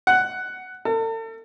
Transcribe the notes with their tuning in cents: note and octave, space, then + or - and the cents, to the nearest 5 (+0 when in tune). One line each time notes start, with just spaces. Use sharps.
F#5 +10
A4 +40